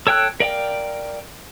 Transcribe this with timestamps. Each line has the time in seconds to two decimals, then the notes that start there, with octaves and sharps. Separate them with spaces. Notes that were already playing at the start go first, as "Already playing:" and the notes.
0.07 A4 C#5 G5 E6 F#6
0.40 A#4 D5 F5 G5